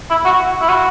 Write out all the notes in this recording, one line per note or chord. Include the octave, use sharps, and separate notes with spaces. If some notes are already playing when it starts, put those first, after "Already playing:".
E4
F#4
E4
F#4